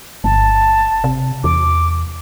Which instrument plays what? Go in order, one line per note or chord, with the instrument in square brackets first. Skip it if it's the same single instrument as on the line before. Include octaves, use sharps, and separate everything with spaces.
[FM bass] G1 [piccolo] A5
[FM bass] C3
[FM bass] E2 [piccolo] D6